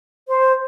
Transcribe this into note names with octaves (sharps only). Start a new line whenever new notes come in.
C5